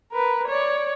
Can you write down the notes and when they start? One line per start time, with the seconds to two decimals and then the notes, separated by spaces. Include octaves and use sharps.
0.12 A#4 B4
0.48 C#5 D5